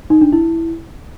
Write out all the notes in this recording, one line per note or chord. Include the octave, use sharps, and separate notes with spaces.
D#4
D4
E4